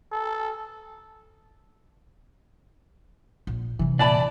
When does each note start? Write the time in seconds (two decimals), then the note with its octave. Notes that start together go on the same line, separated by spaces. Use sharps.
0.12 A4
3.47 A#1
3.79 F#2 C3 E3
3.99 A#2 E3 D5 A5 B5